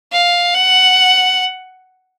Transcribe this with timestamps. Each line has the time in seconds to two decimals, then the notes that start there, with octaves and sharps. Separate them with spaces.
0.12 F5
0.54 F#5